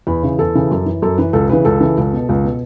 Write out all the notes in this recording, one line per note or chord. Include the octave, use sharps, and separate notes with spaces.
E2 B5
C#3 E3
E2 A4
C#3 E3
F#2
E3
F#2 A4
E3 B4
C#2 A4
C#3 E3 B4
C#2 A4
C#3 E3
C#2
B2
C#2
B2